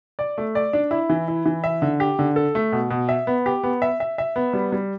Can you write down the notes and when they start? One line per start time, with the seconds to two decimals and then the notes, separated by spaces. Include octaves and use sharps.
0.19 D5
0.38 A3
0.55 D5
0.73 D4
0.91 E4
1.10 E3
1.28 E4
1.46 E3
1.64 E5
1.82 D3
2.00 G4
2.19 D3
2.36 A4
2.55 A3
2.72 B2
2.90 B2
3.09 E5
3.27 B3
3.46 G4
3.64 B3
3.82 E5
4.00 E5
4.18 E5
4.36 B3
4.53 G3
4.72 G3